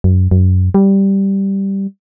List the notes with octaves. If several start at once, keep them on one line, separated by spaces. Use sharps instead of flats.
F#2
F#2
G3